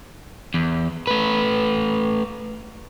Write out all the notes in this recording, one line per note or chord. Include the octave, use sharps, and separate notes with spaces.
E2
A3 B4